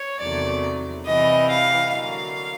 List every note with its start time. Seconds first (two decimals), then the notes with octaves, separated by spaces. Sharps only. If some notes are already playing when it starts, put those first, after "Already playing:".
Already playing: C#5
0.21 E2 C3 D#3 F#3 A3 D5
1.06 C3 E3 G3 D#5
1.49 F5
1.92 D3 F#3 A#3 F5